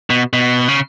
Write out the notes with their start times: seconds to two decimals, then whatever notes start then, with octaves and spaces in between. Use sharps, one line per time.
0.10 B2
0.33 B2
0.68 C#3